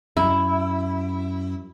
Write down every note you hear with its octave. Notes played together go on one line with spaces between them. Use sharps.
F#2 E4